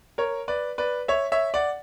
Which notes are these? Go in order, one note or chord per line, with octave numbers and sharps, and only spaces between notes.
A#4 C#5
B4 D5
B4 D5
C#5 E5
C#5 E5
D5 F#5